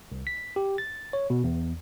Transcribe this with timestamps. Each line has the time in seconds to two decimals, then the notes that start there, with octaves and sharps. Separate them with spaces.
0.12 C2
0.27 B6
0.56 G4
0.78 A6
1.13 C#5
1.30 B2
1.44 E2